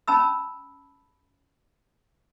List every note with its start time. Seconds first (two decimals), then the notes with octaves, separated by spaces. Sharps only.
0.08 C#4 A5 B5 E6